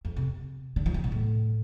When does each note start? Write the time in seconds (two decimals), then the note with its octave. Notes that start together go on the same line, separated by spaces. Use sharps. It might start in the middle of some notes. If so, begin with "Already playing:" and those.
0.05 F2
0.17 C3
0.76 D3
0.86 F3
0.94 E3
1.04 B2
1.12 A2